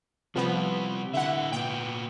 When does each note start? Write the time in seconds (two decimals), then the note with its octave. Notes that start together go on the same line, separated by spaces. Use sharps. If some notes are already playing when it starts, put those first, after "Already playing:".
0.36 C3 F3 G3 B3
1.14 D3 E4 E5 F#5
1.52 A#2 B3 G5